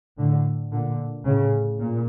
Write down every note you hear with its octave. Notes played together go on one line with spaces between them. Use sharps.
A2 D3
A#2 D3
A2 C#3
A#2